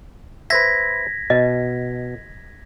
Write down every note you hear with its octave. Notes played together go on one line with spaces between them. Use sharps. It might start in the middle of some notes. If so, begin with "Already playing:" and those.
B4 C5 E5 G#6 A#6 B6
B2 D#5